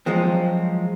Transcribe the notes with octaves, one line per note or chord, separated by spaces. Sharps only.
F2 F3 F#3 G#3 C4